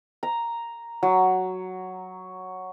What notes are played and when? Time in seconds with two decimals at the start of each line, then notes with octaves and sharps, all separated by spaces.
0.23 A#5
1.03 F#3